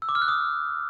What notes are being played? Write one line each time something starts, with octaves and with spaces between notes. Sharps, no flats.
E6
D6
F6
F#6
D#6